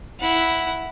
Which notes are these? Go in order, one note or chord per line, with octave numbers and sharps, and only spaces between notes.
E4 F#5